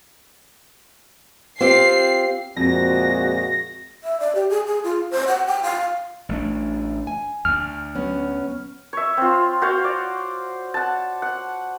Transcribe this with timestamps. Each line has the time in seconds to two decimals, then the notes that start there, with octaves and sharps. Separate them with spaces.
1.61 C4 F4 G4 C7
2.57 F2 A#2 G#3 C4 F#4 A#6
4.04 E5
4.20 D5
4.35 G4
4.50 G#4
4.67 G#4
4.84 F4
5.11 C5
5.28 F#5
5.47 G5
5.63 F5
6.29 A1 A3 D4
7.07 G#5
7.45 D2 F6
7.95 F#3 B3 C#4
8.93 C#5 E5
9.17 C4 F4
9.62 F#4 C5 C#5 F5
9.84 D5
10.74 F#5 A5
11.22 F#5